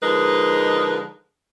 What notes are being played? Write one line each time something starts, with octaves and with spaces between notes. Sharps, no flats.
D3 F3 G#3 D#4 A#4 B4